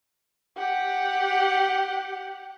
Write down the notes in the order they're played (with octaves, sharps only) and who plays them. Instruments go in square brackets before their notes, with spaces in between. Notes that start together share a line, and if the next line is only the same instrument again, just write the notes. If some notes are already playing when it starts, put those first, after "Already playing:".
[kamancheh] G4 F#5